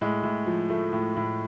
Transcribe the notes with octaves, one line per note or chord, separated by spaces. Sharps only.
A2 G#3
A2
F3
F3 A3
A2
A2